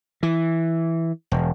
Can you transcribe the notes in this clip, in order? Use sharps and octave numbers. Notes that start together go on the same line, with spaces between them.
E3
E1